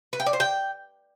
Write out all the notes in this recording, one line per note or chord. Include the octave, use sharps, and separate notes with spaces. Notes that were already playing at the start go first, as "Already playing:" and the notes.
B4
G5
D5
C5
G5